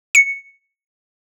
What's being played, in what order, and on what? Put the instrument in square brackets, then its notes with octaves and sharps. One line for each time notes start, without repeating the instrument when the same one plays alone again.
[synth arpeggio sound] C#7